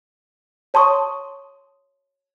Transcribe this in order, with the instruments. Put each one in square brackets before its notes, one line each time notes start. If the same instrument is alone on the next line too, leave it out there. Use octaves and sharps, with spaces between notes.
[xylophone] C#5 A5 C6 C#6 D#6